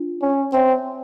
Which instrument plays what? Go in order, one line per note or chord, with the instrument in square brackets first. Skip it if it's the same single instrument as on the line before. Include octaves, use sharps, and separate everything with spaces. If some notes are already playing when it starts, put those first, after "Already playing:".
Already playing: [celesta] D4 F4
[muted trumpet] C#4
[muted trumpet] C4 [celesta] C#5 E5 A5